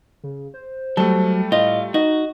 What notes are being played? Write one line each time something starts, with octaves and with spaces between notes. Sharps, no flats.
C#3
C5
F#3 G3 A3 A5
A2 F4 D#5
D#4 F#4 D#5